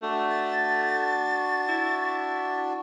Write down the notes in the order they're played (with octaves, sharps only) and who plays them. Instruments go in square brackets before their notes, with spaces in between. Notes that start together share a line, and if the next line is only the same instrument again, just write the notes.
[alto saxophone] A3 [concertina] D4 F#4
[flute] A6
[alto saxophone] E4